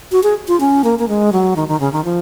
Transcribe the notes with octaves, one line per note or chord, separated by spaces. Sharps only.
F#4
G#4
F4
C#4
A#3
A#3
G#3
F#3
D#3
D#3
C#3
D#3
F3